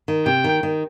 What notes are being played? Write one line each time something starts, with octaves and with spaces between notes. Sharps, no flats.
D#3
C3 G5
D#3
D#3